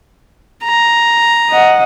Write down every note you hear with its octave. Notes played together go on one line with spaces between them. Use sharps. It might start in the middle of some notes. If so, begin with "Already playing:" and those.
A#5
D#5 F#5